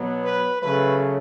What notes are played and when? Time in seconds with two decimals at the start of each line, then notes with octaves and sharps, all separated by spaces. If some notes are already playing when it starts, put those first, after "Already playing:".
Already playing: B2 F#3 B3
0.24 B4
0.62 C#3 F#3 A3 B4